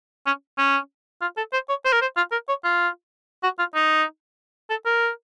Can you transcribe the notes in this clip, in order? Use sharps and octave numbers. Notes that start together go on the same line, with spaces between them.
C#4
C#4
F4
A4
C5
C#5
C5
A#4
C5
F4
A#4
C#5
F4
F#4
F4
D#4
A4
A#4